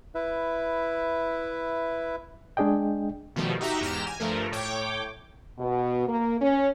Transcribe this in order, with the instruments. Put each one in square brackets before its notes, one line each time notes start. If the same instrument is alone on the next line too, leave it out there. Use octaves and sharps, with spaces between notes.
[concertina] E4 B4 E5
[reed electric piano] G#3 D4 G#4 D#5 G5
[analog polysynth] B2 D#3 F3 G3 A3
D#4 F#4 G4 E5 A#5
E2 G#2 G4 A#5 F6 E7
G#5
G2 F3 A3 A#4
A2 C#5 G5 D6
[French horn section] B2
A#3
C#4